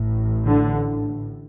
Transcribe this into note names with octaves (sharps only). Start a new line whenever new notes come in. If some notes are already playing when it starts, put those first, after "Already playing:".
Already playing: A1 A2
D3